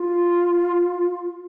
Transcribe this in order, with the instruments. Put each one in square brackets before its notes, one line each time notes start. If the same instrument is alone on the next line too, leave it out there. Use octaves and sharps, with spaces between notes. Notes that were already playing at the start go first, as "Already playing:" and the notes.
Already playing: [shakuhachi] F4